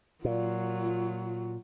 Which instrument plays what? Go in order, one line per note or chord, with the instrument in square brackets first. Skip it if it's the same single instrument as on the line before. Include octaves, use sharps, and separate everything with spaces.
[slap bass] A#2 [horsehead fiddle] F#3 F4